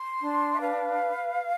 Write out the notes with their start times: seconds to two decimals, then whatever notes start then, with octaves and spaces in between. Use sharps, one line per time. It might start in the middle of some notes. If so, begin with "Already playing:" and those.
Already playing: C6
0.21 D4
0.53 E5
0.60 B4 F5